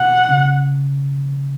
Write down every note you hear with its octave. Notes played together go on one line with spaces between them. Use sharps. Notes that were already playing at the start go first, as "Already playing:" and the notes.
Already playing: B2 F#5
C#3